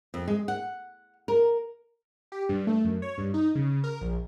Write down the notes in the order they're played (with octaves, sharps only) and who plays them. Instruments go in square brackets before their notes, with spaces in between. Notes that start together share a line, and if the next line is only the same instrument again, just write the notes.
[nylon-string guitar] F2
G#3
F#5
A#4
[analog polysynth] G4
G2
A3
F#2
C#5
G2
D#4
C#3
A#4
A#1